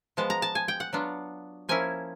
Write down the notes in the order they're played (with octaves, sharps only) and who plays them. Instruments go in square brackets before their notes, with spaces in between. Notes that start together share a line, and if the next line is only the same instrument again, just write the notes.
[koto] F3 G#3 B3 A5
A#5
A5
G#5
G5
F#5
F#3 B3 D4 F4
F3 A#3 C#4 E4 G#5